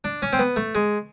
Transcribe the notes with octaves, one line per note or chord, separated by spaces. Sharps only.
D4
C#4
C4
B3
A3
G#3